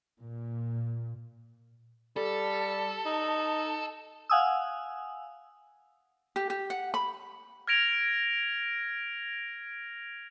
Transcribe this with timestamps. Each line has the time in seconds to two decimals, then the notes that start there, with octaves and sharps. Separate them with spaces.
0.21 A#2
2.17 G3 A4
3.06 D#4
4.30 F5 F#5 G#5 D#6 E6
6.36 G4
6.50 G4
6.70 F#5
6.94 B5
7.67 F6 G#6 A#6 D7 F7